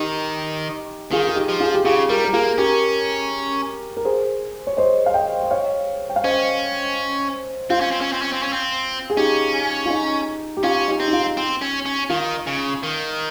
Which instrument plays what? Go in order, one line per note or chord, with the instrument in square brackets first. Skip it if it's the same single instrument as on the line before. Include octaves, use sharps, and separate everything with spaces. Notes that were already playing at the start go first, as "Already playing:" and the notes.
Already playing: [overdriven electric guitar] D#3 [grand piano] D#4 G4
[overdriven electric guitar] D#3 [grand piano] F4 G#4
[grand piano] G#4
D#4 G4
[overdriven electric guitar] F3
[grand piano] F4 G#4
G4
[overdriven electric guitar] C#3 [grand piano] F4 G#4
[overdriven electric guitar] G3 [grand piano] G4 A#4
[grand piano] A#4
[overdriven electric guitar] A#3 [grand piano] F4 G#4
[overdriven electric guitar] C#4 [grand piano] G4 A#4
[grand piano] A#4
G#4 C5
C#5
C5 D#5
F5
D#5 G5
D#5
C#5 F5
G5
F5
[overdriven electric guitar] C#4 [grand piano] C5 D#5
[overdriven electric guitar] C4 [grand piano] F4
[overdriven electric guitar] C#4
C4
C#4
C4
C#4
C4
C#4
C4
[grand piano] G#4
[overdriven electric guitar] C#4 [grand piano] D#4 G4
[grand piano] F4
D#4
G4
[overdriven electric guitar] C#4 [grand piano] F4
[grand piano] D#4 G4
[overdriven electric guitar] C4
[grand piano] D#4
F4
[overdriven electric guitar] C4
C#4
C#4
[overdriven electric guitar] D#3 [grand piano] F4
[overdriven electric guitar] C#3
D#3